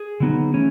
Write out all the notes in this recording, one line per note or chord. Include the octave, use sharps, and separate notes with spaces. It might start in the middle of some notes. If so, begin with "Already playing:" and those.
Already playing: G#4
D3 F#3 B3 D#4
E3 A3 C#4